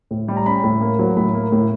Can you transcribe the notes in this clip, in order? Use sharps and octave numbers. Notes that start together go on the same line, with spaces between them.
A2
G3
A#5
C#4 B5
A2
A#3
F#3
A2 B5
A#3
A2